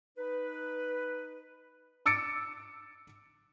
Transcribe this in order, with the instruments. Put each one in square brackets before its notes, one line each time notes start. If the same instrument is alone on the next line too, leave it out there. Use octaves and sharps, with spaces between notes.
[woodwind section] D#4 B4
[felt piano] D6 E6 A6 C#7 D7